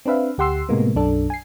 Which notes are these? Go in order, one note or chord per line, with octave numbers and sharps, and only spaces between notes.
C4 D4 B4 E5 F5
D2 G4 F#5 C6 E6 C7
A2 C3 G#3 A#3 B3
B1 F#2 D4 A4
G#5 C7